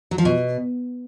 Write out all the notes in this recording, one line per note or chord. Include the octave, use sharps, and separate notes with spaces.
F#3
F3
B2